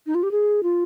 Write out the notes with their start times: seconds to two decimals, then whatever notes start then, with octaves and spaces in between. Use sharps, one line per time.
0.06 D#4
0.15 F4
0.23 G4
0.31 G#4
0.63 F4